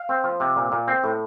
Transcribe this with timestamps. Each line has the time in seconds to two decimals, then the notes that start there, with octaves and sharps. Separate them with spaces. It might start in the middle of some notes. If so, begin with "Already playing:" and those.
Already playing: F5
0.09 C4
0.24 F3
0.40 C3
0.56 A#2
0.72 A#2
0.88 C4
1.04 A2